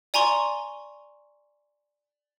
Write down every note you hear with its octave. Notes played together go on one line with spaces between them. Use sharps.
D5 G#5 A#5 C6 C#6